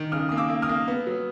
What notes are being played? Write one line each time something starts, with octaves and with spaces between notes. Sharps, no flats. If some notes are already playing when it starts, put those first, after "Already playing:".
Already playing: D#3
C#3 D#6 F6
A#3 D#6
D6 E6
A#3
D#6 F6
A#3
B3
F#3